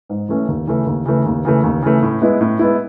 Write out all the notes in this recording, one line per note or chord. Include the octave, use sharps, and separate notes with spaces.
G#2
E3 A3 C#4
D#2
C#3 E3 A3
D#2
C#3 E3 A3
D#2
C#3 E3 A3
D#2
C#3 E3 A3
A2
G#3 B3 E4
A2
G#3 B3 E4